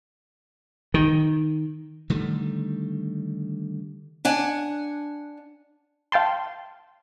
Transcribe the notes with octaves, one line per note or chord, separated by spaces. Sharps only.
D#3
D3 D#3 G3 A3
D4 F#5 G#5
F5 G5 A5 C6